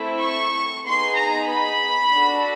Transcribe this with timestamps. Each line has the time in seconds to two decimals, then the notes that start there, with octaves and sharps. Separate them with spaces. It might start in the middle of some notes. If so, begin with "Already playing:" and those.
Already playing: A3 C4 E4 A4
0.21 C#6
0.85 B3 D#4 G#4 C6
1.17 A#5
1.49 B5
2.13 D4 F#4 A4